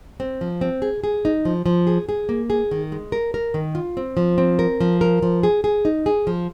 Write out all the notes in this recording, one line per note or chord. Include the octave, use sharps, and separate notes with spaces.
C4
F3
C4
G#4
G#4
D#4
F3
F3
G#4
G#4
A#3
G#4
D#3
G#3
A#4
A#4
D#3
F4
C4
F3
C4
A#4
F3
A#4
F3
G#4
G#4
D#4
G#4
F3